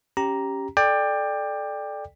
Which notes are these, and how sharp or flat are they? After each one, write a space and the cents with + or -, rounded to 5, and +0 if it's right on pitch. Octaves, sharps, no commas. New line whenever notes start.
C#4 +0 G4 -5 A#5 +5
A4 -20 D5 +15 G5 +20